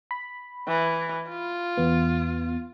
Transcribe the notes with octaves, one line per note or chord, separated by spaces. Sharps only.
B5
E3
F4
E2 B3